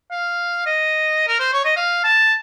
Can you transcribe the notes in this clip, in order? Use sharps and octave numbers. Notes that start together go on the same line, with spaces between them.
F5
D#5
A#4
C5
C#5
D#5
F5
A5